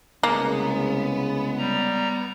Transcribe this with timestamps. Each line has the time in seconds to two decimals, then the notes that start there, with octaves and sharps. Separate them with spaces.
0.23 C2 C#3 G#3 A#3 B3
1.58 G3 A#5